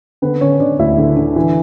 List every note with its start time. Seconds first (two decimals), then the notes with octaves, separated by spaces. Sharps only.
0.22 D3 B3 B4
0.41 D3 C#4 C#5
0.60 D3 D4 D5
0.79 D2 E4 E5
0.98 D3
1.17 D3
1.36 E3